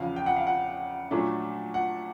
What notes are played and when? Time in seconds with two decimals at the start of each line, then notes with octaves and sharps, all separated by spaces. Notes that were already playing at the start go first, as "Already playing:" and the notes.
Already playing: E2 C#3 F3 F5
0.16 G5
0.26 F#5
0.36 F5
0.47 F#5
1.11 A#2 F#3 A3 D4
1.74 F#5